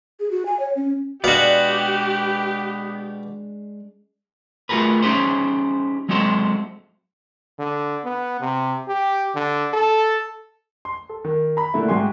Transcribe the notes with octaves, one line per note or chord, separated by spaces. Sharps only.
G#4
F#4
G#5
C#5
C#4
B2 G#3 B3 D4 F#4 G4 D5 F5
A3 F4 F#4 G#4 A#4 B4
C#4 D#4 G4 G#4 C5
F#3 G#3 C4 F#4 A4 C5
D3
B3
C3
G4
D3
A4
C6
A4
D#3
A#5 B5
A#2 D3 A3 E4
G#2 F#4 G4 G#5 C6